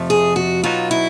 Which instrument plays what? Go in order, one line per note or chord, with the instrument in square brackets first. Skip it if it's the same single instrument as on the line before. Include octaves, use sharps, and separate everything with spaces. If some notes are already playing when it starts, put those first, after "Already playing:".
Already playing: [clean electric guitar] F2 C3 F3 A3
[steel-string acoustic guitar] G#4
F#4
[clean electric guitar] B2 F#3 B3 D#4 F#4 [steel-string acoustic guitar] F4
[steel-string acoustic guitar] E4